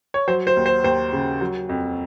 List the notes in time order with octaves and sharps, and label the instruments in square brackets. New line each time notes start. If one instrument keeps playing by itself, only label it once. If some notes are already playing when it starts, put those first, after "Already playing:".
[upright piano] C#5
F#3 C5
C5
D#2
C5
D#2 C5
C#3
F#3
F2